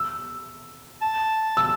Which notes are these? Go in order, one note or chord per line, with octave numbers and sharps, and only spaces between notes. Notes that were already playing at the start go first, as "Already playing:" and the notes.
Already playing: E6
A5
E6